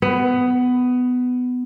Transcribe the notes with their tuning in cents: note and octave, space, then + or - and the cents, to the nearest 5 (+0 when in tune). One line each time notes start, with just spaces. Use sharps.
B3 +15